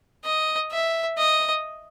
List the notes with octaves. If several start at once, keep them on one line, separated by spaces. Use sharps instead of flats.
D#5
E5
D#5